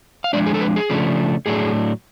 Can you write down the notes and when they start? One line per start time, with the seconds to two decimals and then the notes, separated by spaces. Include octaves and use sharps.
0.24 F5
0.33 F3 G#3 D4 D5
0.46 G#4
0.54 A4
0.61 B4
0.76 G#4
0.90 C#3 F3 A3 D4
1.46 A2 F#3 A3 D4 G#4